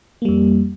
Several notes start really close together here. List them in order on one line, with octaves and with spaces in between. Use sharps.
A#3 G3 F2